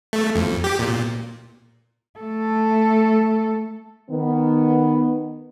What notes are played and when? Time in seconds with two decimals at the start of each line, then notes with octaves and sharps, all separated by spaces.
0.13 A3
0.35 F2
0.64 G4
0.79 A#2
2.19 A3 A4
4.11 D#3 B3